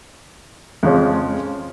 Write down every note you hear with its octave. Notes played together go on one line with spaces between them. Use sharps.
F2 C#3 F3 G#3 C#4